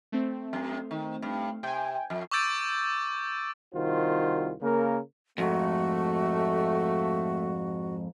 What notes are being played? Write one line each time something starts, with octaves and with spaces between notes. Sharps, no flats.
A3 C4
F#2
D#3
G2
C3 G5 G#5
F2
C#6 D6 E6 G6 A6 D7
C2 D#3 F4 F#4 C5
C#3 A#3 A#4
F2 G#2 A3 F#4